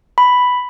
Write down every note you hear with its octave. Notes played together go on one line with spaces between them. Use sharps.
B5